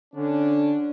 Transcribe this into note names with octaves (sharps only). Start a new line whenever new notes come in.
D3 C#4 D4